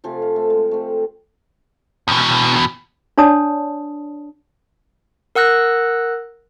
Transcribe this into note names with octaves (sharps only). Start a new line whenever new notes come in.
C3 F3 A3 G#4
F5
A3
G#3
A3 C4
E2 B2
D4 C#5 D5 A5 D#6
A#4 F#5 E6 F#6 A#6